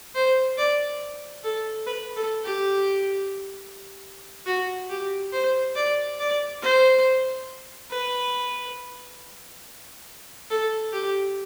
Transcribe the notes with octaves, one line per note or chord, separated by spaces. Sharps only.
C5
D5
A4
B4
A4
G4
F#4
G4
C5
D5
D5
C5
B4
A4
G4